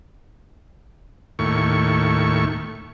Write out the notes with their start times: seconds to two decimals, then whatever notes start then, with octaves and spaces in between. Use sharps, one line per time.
1.39 D#2 A2 C#6